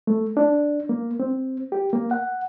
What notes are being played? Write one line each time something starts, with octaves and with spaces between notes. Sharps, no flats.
A3
D4
A#3
C4
G4
A#3
F#5